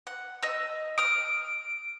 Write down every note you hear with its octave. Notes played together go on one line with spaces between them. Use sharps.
F#5
D#5 E6
D#6 F6 D7